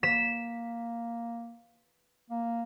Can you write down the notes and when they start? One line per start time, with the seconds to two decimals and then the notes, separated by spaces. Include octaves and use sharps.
0.03 A#3 B6 E7
2.30 A#3